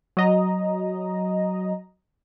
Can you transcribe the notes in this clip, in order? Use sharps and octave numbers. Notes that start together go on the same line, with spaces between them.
F#3 D#5 A#5